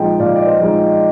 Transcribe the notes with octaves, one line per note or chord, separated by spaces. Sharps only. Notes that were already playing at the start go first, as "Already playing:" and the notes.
Already playing: A#2 F3 G#3 D#4 D#5 G5
A#2 D5 F5
D5
C5 D#5
F3 G#3 D#4